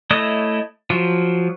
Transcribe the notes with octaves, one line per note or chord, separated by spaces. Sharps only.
A3 E4 C#5 D#5 D#6
F3 F#3